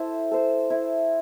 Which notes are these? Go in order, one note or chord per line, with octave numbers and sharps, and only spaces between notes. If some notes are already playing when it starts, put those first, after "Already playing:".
Already playing: E4 A4 C5
A4 C5
E4